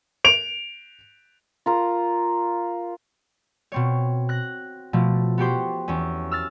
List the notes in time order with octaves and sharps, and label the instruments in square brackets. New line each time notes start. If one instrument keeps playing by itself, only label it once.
[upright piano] D7 F7
[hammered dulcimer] F4 A#4
[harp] B2 C4 C#5
F#6 A#6
B2 F3 A3
B3 F#4 G4 C5
E2 C#4
E6 F6 A6